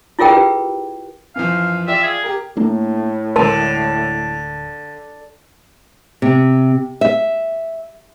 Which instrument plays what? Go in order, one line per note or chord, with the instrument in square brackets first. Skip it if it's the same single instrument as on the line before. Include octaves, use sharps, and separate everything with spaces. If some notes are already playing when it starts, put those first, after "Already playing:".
[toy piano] E4 F4 G#4 A#4 G5
G4 B4
[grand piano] F#2 E3 F3 [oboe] F5
[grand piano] F4 D5 G5 [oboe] E5
[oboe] G#4
[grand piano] G4 A#4
[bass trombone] A2 [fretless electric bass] A3 A#3 D4
[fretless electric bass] D1 D2 G#3 [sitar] D3 [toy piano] A#4 A5
[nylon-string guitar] C3
E5